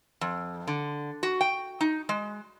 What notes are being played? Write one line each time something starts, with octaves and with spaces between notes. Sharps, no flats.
F2
D3
F#4
G5
D#4
G#3